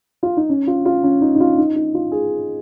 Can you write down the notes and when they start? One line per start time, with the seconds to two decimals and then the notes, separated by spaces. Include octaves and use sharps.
0.23 F4
0.37 D#4
0.49 C#4
0.67 F4
0.85 F4
1.04 C#4
1.21 D#4
1.35 D#4
1.40 F4
1.58 D#4
1.76 D#4
1.94 F4
2.12 G#4